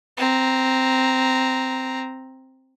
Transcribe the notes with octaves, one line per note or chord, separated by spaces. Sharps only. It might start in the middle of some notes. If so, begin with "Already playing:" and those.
C4 A#5